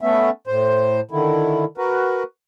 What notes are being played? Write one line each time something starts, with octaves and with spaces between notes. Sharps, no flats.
A3 B3 C#4 E5
A2 C5
D3 D#3 E4
F#4 A#4 B4